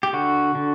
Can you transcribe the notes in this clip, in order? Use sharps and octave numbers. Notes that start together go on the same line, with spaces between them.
G4
D3 F#4
D3